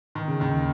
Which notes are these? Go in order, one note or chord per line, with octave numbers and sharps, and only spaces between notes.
D#3
C#3
D#2 D#3